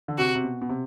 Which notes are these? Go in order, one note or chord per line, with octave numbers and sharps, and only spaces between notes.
D3
C3 F#4
C3
B2
B2
C3